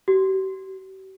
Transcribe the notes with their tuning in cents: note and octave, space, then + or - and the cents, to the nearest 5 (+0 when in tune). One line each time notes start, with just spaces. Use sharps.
G4 -45